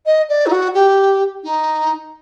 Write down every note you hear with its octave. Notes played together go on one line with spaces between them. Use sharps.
D#5
D5
D#4
F#4
G4
D#4